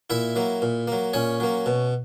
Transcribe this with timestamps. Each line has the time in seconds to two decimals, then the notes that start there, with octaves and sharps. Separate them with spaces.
0.10 A#2 E4 E5
0.36 F#3 A#3
0.62 A#2
0.88 F#3 A#3
1.13 A#2 C#4 C#5
1.40 F#3 A#3
1.66 B2